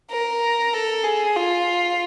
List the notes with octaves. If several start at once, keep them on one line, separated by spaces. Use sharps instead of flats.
A#4
A4
G#4
F4